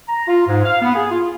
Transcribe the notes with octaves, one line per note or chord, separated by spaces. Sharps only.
A#5
F4
G#2
F5
B3
G#4
F4